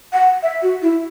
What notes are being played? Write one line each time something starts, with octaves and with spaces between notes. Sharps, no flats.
F#5
E5
F#4
E4